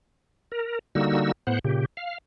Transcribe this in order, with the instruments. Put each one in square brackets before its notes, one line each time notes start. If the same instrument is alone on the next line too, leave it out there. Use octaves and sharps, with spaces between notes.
[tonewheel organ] A#4
D3 G3 A#3 D#4 F#4 E6
A2 B3 C5 F#5
A#2 C#3 G4
F5